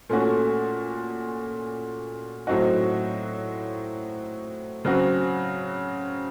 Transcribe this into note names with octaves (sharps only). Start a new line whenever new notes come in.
A#2 A3 C#4 F#4
A2 F#3 C4 D#4 F#4
C#3 F#3 C4 F#4